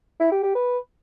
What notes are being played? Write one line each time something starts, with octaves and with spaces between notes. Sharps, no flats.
E4
G4
G4
B4